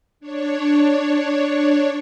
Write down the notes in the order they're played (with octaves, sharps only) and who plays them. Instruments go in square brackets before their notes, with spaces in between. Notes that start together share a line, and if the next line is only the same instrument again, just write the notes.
[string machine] D4 C#5